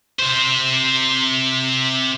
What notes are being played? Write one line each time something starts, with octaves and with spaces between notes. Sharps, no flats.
C3 C5